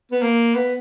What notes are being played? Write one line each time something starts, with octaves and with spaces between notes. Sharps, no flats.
B3
A#3
B3